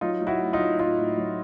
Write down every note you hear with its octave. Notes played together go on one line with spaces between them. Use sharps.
F#3 D#4 F4
F#3
E4 F#4
A2
D#4 F4
F#3
A2 D#4 F4
A2
F#3